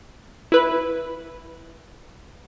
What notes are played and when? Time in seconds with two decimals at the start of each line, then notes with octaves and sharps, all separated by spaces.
0.52 E4 B4